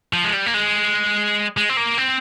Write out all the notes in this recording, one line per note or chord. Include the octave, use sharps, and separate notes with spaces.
F3
G#3
G3
A#3
G#3
G#3
C4
A#3
C4